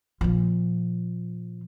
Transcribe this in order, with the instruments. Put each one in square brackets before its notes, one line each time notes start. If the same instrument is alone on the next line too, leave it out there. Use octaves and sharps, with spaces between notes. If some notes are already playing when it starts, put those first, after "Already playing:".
[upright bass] A#2 F3